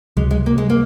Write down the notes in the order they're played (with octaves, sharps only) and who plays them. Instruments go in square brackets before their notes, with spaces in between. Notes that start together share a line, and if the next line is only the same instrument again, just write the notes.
[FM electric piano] C#2 C3 F#3 [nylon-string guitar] G#3
[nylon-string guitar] G#3
A#3
G#3
A#3